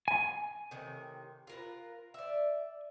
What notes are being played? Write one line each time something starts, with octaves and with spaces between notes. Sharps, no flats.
G#5
A2 C3 D#3
F4 A#4 B4
D5 E5